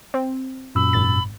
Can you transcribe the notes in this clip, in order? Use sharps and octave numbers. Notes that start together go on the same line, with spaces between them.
C4
F#2 A#2 B5 E6
G#1 A6